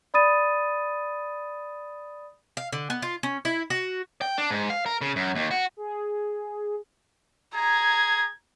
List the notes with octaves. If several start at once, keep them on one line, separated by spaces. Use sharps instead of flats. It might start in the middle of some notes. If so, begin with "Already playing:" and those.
D5 B5 D#6 A6 D#7
F5
D3
B3
F4
C#4
E4
F#4
G5
D4
G#2
F5
A#4
C#3
F#2
D#2
F#4
G#4
G#4 A#5 G#6